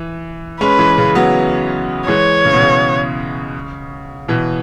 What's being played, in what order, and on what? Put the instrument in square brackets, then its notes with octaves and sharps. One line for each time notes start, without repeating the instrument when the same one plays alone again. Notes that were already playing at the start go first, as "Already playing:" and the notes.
Already playing: [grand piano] E3
[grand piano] G#3 C#4 [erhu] B4
[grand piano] E3 G#3
C#3
F#3 B3
[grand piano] E3 G#3 [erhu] C#5
[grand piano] C#3
B2
C#3
B2 E3